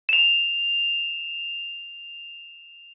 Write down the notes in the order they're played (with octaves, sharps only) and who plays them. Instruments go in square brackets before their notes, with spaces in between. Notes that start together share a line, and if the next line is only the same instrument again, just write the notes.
[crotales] E7 F7